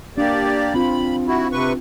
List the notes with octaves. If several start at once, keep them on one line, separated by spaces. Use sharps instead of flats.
A#3 D4 G4 D5
C4 F4 B5
E4 F#4
C3 B4 C#6